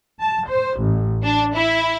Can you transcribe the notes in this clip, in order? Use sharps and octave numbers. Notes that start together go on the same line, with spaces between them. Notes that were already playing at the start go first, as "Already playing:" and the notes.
A5
C5
A1
D4
E4